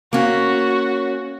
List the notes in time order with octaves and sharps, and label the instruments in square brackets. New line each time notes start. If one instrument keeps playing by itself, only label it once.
[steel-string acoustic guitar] A#3 C#4 [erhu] F#4